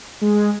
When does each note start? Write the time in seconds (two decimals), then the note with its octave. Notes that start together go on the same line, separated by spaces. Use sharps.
0.21 G#3